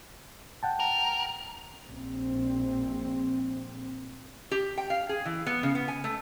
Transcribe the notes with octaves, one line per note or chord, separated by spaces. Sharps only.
F#5 G5 A5
A#4
A#1 C4
G4
G5
F5
G#4
E3
B3
C#3
B3
G#5
A3